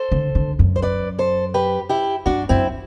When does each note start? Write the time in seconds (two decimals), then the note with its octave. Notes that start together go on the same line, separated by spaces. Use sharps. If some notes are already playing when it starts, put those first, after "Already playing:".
Already playing: A4 C5
0.12 D3
0.35 D3
0.59 F#2
0.76 C5
0.82 B4 D5
1.19 A4 C5
1.54 G4 B4
1.89 E4 G4
2.26 G2 D4 F#4
2.49 F#2 C4 E4